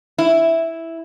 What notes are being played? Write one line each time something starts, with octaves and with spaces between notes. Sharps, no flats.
E4